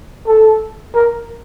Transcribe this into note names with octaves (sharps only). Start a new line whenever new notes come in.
A4
A#4